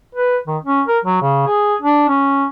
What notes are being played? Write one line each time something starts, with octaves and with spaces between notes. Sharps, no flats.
B4
D#3
C#4
A#4
F#3
C#3
G#4
D4
C#4